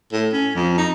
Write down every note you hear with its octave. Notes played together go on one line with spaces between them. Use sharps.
A2
C#4
F2
D#4